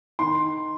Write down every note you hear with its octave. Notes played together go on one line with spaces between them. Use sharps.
D#3 C6